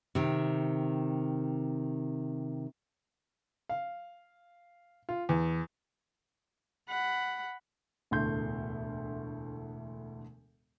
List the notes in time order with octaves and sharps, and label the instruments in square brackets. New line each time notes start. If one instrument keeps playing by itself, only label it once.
[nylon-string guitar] C3 D#3
[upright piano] F5
F4
E2
[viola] F#5 B5
[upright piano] E1 D2 A2 A3 C6 G6